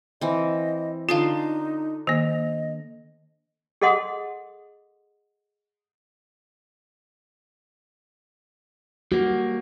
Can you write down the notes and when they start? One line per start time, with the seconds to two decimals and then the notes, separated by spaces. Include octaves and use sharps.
0.21 E3 C4 D#5
1.09 D3 D#4 F4 F5 A5 C6
2.07 D#3 A#3 D#5
3.82 G#4 A4 D#5 F#5 C6 D#6
9.12 G3 A#3 F#4